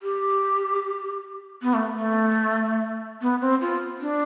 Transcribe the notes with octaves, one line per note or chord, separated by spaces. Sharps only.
G4
B3
A3
A3
B3
C4
F4
D4